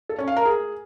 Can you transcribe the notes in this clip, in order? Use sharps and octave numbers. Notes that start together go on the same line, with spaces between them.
A4
C#4
F5
A#4
G#4